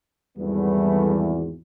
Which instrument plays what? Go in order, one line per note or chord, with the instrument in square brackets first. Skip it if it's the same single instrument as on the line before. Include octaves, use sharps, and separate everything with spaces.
[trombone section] G#1 E2 [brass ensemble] G3 A3 B3